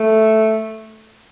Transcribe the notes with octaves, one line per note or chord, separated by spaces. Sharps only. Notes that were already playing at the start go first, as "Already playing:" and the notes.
Already playing: A3